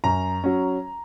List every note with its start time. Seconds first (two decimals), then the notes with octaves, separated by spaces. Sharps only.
0.04 F#2 A#5
0.44 F#3 C#4